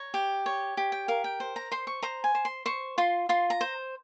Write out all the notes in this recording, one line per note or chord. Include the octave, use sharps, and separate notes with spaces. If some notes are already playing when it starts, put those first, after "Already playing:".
Already playing: C#5 A#5
G4
C#5
G4
G5
A#4 F5
G5
C5
A#5
C5 C6
C#6
C5 A#5
G#5
C5
C6
C5 C#6
F4 C6
F4 C6
A#5
C5